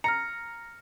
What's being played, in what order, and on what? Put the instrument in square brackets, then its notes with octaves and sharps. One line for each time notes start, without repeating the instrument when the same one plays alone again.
[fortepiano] A#5 [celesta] F6 A#6 C#7